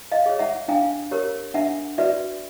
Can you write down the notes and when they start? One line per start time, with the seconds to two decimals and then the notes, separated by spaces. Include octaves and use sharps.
0.12 D#5 F5
0.26 G#4 C#5
0.39 E5 F#5
0.68 D4 F5 G5
1.11 G4 A#4 C#5
1.54 D4 E5 F#5
1.98 F#4 B4 D5 E5